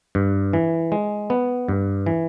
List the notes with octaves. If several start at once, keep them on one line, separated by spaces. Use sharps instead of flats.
G2
E3
G#3
B3
G2
E3